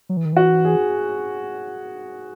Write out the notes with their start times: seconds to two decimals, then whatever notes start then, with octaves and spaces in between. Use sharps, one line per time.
0.09 F#3
0.17 E3
0.25 D#3
0.33 E3 F#4
0.65 G#4